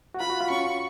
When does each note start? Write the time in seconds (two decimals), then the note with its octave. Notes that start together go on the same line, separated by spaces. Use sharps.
0.14 F#4
0.20 F4 B5
0.30 F#4
0.41 F4
0.50 C#4 C#6